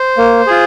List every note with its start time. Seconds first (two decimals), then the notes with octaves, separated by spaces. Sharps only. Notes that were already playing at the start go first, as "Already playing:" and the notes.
Already playing: C5
0.18 A#3
0.47 F4 G#4